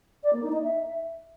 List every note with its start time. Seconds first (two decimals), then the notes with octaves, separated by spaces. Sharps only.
0.23 D5
0.33 A#3
0.43 D#4
0.52 D#5
0.62 E5